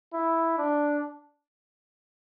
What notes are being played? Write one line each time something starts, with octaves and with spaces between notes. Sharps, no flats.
E4
D4